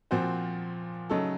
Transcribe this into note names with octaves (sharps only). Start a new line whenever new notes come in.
A#2 F3 C4 F#4 C5
C#3 F#3 A3 D#4 A4